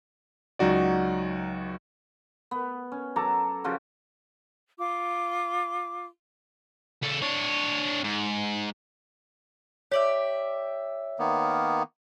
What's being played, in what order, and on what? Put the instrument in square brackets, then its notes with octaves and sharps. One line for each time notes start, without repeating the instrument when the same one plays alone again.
[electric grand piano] C#2 F#3 D#4 F#4 D5
[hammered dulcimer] B3
C#4
F#3 A4 A#5 D6
C#3 F3 F#4
[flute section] F4 D6
[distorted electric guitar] C#3 A4
D4 C#5
G#2
[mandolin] G4 D5 E5 [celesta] C#5
[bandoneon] D#3 A#3 B3